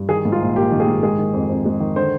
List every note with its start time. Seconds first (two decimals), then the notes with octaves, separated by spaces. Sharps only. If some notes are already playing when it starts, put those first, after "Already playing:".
Already playing: G2
0.09 D#3 G#4
0.25 G#2
0.32 F4
0.41 A#1
0.56 A#3 G4
0.72 D#3
0.80 G#4
0.87 G#2
1.03 G#3 G#4
1.18 D#3
1.34 F2
1.49 F2
1.66 G#3
1.80 D#3
1.96 D3 C5